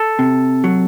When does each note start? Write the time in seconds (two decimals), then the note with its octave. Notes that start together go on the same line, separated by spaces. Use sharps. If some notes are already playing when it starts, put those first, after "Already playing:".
Already playing: A4
0.19 C3
0.64 F#3